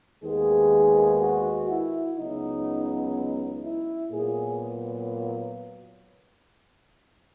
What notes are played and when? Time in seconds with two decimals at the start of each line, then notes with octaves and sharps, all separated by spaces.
0.23 D#2 D#3 G#3 B3 G#4
1.20 F#4
1.69 E4
2.17 C#2 C#3 F#3 B3 D#4
3.14 D#4
3.62 E4
4.11 A#2 F#3 B3 G#4